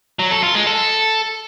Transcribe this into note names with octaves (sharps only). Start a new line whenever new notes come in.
F#3
A4
F4
G#3
A4